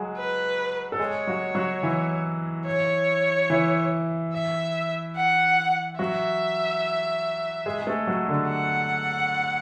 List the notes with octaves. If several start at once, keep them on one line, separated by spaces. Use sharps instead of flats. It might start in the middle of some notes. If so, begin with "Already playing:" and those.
Already playing: F#3 G#3 F#4 G#4
B4
A4
G#3 G#4 C#5
F#3 F#4
F#3 F#4
E3 E4
C#5
E3 E4
E5
F#5
F#3 F#4 E5
G#3 G#4
G#4
A3 A4
F#3 F#4
D3 D4
F#5